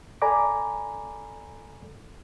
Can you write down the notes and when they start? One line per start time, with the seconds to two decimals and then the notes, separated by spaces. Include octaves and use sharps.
0.22 A4 D5 G#5 A#5 B5 D6